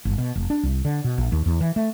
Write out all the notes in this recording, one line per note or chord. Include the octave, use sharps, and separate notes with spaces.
G1
B2
F1
D4
C2
D3
B2
A#1
D#2
E2
E3
A3